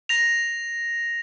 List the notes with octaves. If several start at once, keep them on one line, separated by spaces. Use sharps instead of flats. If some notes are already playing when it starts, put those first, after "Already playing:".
A#6 F7